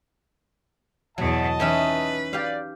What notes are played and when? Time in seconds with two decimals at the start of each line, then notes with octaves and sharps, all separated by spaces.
1.18 E2 B2 F#3 D#5 A5
1.60 E3 C#4 D#4 B4
2.33 G4 D5 F5